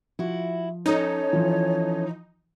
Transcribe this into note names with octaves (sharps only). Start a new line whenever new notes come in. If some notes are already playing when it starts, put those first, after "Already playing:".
F3 E4 F#4
C#4 D#4 A4 C#5
E3 F3